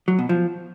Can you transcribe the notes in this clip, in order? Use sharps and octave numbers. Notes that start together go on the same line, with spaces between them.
F#3
B2
F3